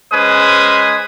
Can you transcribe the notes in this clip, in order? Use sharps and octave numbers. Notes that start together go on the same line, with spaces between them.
G#3 C#4 B4 C5 G#5 D#6